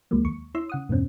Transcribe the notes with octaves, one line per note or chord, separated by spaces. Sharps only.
C#2 F3 F#3 G#3 A#3
D#2 C#6
E4 C#5 C6 E6
C#3 F#5 D#6
E2 G2 B2 C4 C#4